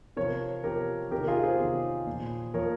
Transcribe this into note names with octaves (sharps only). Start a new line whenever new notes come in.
C3 F3 A#4 C#5
C3 F3 G4 A#4
C3 D#3 G4 A#4
F4 G#4
G#4 C5
C3 D#3
A#2 F3
A#2 F3 A#4 C#5